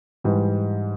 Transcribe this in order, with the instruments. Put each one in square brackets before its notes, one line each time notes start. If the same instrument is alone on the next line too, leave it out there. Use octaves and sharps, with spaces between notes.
[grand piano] G#2 E3 G3